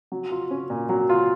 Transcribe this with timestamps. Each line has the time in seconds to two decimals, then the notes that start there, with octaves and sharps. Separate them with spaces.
0.12 F#3
0.31 F4
0.51 C#4
0.70 A#2
0.89 F#3
1.09 F4